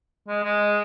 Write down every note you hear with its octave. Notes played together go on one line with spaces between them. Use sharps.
G#3
G#3